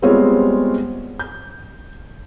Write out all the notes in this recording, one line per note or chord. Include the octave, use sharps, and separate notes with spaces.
G3 G#3 B3 C4 F4 C#5
G6